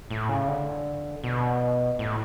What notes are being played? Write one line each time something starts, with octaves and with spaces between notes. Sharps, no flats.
A2
C#3
D3
B2
A2